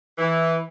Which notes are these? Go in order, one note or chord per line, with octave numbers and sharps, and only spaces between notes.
E3